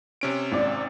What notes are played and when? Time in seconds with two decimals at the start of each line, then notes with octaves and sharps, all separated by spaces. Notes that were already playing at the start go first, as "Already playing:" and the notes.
0.21 C3 C#4 D7
0.52 G#1 D5